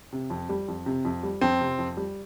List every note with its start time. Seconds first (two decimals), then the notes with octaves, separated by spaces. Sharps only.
0.13 C3
0.30 F2
0.49 G3
0.68 F2
0.86 C3
1.05 F2
1.23 G3
1.41 F2 C4
1.61 C3
1.79 F2
1.97 G3